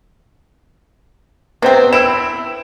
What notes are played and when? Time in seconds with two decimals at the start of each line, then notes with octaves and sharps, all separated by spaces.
1.62 C3 B3 C4 C5 G5
1.93 E4 E6 D7 E7